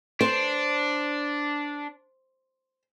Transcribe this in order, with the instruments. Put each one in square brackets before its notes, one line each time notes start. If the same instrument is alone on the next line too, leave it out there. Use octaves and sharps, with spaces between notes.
[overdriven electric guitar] D4 [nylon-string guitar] C5